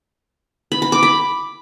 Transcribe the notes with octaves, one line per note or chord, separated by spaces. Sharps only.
B5
B5
D6
B5